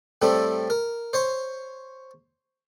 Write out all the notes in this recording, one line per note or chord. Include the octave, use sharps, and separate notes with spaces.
A2 G3 A3 C4 E4
A#4
C5 C#5 C6